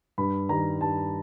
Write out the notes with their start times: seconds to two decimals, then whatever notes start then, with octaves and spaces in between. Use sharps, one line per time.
0.18 G2 B5
0.49 D#3 G3 A#5
0.81 G2 A5